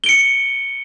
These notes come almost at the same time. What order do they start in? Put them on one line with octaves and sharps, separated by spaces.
G7 D7 C#7